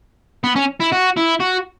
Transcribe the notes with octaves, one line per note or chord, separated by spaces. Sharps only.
B3
C#4
E4
F#4
E4
F#4